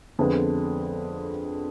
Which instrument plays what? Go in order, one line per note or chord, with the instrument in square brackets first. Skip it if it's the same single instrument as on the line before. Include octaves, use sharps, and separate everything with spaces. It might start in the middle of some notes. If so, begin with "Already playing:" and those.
[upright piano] F2 D3 G#3 B3